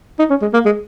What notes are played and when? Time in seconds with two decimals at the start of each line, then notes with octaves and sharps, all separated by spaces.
0.19 D#4
0.30 C#4
0.42 G#3
0.53 A#3
0.65 G#3